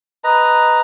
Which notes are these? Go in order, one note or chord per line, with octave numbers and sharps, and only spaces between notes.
B4 D#5 A#5